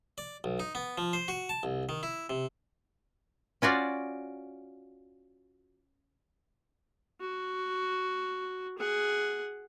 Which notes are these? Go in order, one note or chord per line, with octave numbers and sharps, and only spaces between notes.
D5
B1
D#4
B3
F3
C5
F#4
A5
C2
D#3
E4
C3
C#4 F4 F#4 D5
F#4
G#4 F#5